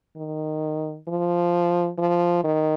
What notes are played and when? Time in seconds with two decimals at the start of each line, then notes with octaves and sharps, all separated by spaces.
0.17 D#3
1.08 F3
1.98 F3
2.44 D#3